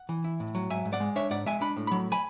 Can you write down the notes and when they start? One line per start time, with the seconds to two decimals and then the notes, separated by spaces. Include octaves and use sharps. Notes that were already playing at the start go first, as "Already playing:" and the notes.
Already playing: F#5
0.09 E3
0.24 E4
0.40 A2
0.55 F#3
0.70 G#2 E5 G#5
0.85 G#2
0.93 D5 F#5
1.00 G#3
1.16 D4 C#5 E5
1.30 G#2 D5 F#5
1.46 G#3 E5 G#5
1.61 D4 B5
1.77 A2
1.87 F#3 B5
2.12 G#5 B5